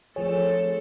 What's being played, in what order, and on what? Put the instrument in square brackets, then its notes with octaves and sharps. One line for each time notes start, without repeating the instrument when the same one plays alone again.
[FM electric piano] F3 G#4 [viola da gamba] A3 C4 A4 [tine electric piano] C#5